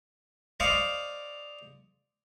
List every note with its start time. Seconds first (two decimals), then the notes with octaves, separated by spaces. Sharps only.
0.60 C5 D5 D#5 F5 C#6 D6